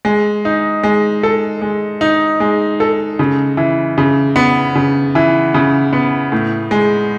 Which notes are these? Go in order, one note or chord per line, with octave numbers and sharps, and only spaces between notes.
G#3
D#4
G#3
A4
G#3
D#4
G#3
A4
C#3
E3
C#3
B3
C#3
E3
C#3
B3
A2
G#3